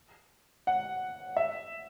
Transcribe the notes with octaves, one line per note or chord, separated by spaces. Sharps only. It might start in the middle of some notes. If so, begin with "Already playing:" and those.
F#5
E5